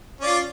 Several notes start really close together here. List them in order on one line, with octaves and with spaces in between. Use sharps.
C#4 D5 F4